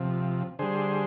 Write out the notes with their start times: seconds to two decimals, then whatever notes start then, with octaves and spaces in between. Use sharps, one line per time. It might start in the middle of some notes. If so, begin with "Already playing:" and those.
Already playing: C3 F3
0.59 D3 G3 G#4 C5